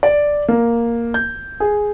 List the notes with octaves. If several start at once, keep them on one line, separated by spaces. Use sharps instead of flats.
D5
A#3
G6
G#4